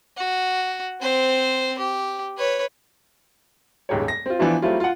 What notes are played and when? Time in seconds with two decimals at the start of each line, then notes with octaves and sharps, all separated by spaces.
0.17 F#4
1.01 C4 C5
1.79 G4
2.38 B4 C#5
3.89 D#1 C#2 G#2 G4 C#5
4.08 A#6
4.26 C4 F4
4.39 E3 F3 B3 D4 E4 F4
4.62 F#3 G3 A3 C4 E4 F4
4.80 F4 F#5